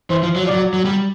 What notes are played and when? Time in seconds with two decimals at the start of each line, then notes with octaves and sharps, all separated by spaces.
0.10 E3 C5
0.23 F3
0.36 F#3
0.43 F3
0.47 F#3 D5
0.74 F#3
0.85 G3